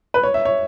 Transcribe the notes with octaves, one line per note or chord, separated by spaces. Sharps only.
B4
C#5
E5
C#5